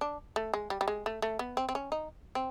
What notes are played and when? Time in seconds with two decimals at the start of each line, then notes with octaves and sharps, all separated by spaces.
0.01 D4
0.36 A3
0.54 G#3
0.70 G3
0.81 G3
0.88 G#3
1.06 A3
1.22 A3
1.39 B3
1.57 C4
1.69 C4
1.75 C#4
1.92 D#4
2.35 C4